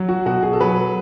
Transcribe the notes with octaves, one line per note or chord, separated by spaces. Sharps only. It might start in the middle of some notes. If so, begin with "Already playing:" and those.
Already playing: F#3
F#4
B2 F#4
G#4
A4
F#3 B4